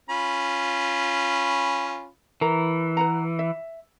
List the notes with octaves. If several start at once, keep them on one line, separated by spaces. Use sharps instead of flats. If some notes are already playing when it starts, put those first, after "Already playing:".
C#4 F4 B5
E3 A#4 A#5
B4 F#5 A#5
E5